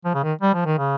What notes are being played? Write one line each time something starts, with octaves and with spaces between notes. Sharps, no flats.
F3
C#3
D#3
G3
F3
D#3
C#3